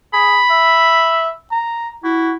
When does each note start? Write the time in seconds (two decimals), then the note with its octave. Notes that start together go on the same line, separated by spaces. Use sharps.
0.13 G#4 B5
0.51 E5
1.51 A#5
2.04 E4 F#4